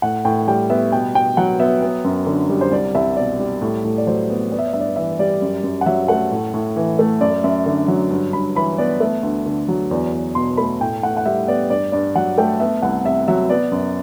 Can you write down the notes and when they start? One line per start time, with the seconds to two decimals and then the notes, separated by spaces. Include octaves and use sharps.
0.02 A2 F#5
0.25 A2 G5
0.47 G3 G5
0.70 B3 E5
0.92 B2 G5
1.15 B2 G5
1.37 F#3 F#5
1.59 B3 E5
1.82 B3
2.05 F#2
2.26 D3
2.50 G3
2.61 C5
2.71 C2 D5
2.95 C2 E5
3.17 B2 D5
3.40 G3
3.62 A2
3.84 A2
3.98 D5
4.07 F#3 C5
4.30 B3
4.52 B3 D5
4.59 E5
4.66 D5
4.73 G2 E5
4.80 D5
4.96 E3 E5
5.19 G3 D5
5.42 F#2
5.64 F#2
5.81 F#5
5.86 F#3 E5
6.08 A3 F#5
6.31 A2
6.54 A2
6.76 E3
6.99 A3
7.21 F#2 D5
7.44 F#2 E5
7.66 D3
7.88 F#3
8.10 G2
8.33 G2 B5
8.55 E3 B5
8.78 B3 D5
9.00 A3 E5
9.23 D2
9.46 D3
9.68 F#3
9.91 E2 D5
10.13 E2
10.35 B2 C6
10.57 A3 B5
10.80 A2 G5
11.03 A2 F#5
11.17 F#5
11.26 G3 E5
11.48 B3 D5
11.70 G2 D5
11.92 G2 D5
12.16 F#3 F#5
12.38 A3 G5
12.60 B3 E5
12.82 C2 F#5
13.05 C3 E5
13.28 F#3 E5
13.49 B3 D5
13.72 F#2